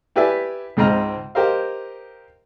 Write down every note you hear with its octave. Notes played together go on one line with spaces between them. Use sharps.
E4 G4 B4 D5 E5 G#5
C#2 G#2 C4 D#5 A#5 F6
G4 A#4 C5 D#5 F5